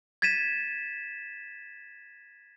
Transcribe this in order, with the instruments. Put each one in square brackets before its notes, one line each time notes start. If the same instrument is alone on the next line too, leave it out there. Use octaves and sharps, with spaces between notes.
[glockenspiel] G#6 A6 B6 D#7 E7